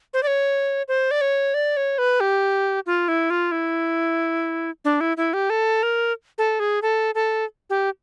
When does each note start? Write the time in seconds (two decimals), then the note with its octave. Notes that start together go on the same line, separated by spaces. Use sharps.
0.14 C5
0.23 D5
0.27 C#5
0.88 C5
1.11 D5
1.21 C#5
1.54 D5
1.77 C#5
1.98 B4
2.20 G4
2.86 F4
3.08 E4
3.30 F4
3.52 E4
4.85 D4
5.01 E4
5.17 E4
5.34 G4
5.50 A4
5.83 A#4
6.38 A4
6.60 G#4
6.82 A4
7.15 A4
7.70 G4